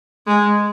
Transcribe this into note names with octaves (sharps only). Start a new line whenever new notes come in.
G#3